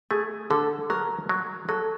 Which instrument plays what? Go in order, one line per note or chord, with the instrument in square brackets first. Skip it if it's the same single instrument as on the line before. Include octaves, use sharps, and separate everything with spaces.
[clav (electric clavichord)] A3 [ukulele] G#4
[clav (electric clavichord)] D3 [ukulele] A4
[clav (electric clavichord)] F#3 [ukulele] A#4
[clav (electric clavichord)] F#3
[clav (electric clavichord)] F#3 [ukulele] A4